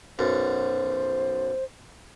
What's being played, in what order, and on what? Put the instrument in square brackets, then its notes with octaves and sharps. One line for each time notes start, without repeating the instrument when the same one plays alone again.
[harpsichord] B1 F#2 [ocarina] C5